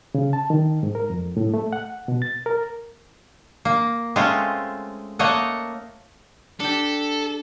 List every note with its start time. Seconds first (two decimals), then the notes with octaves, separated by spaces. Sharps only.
0.15 C#3
0.33 A5
0.50 D#3
0.83 G#2
0.95 A#4
1.10 F2
1.37 A2
1.54 A3
1.73 F#5
2.08 B2
2.22 A6
2.46 A#4
3.65 A#3
4.16 G#3 A3 C4 C#4 F4
5.19 A3 A#3 C#5 D#5 F#5
6.60 D4 G4 A4